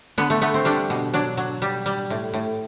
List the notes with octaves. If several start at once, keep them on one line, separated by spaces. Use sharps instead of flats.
D3 B3
A3
A3 B3
C4
G3 D4
B2
F#3 D4
F#3
G3
G3
A2
A2